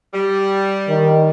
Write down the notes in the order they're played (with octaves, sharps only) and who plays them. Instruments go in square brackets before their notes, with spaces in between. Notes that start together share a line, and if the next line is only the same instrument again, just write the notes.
[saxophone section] G3
[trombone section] D#3